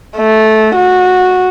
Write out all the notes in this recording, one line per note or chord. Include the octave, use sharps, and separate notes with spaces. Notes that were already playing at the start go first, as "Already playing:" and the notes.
A3
F#4